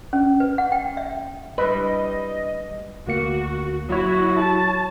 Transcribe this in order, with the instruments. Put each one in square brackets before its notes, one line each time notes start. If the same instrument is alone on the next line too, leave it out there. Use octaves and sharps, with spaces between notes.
[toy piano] C#4
B4
F#5
G5
E5
[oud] G3 D4 E4 [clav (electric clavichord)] B4 [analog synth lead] D#5
[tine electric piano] D2 A#3 C#7 [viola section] F#4
[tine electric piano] F#3 C#5 [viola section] E4 F#4
[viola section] A5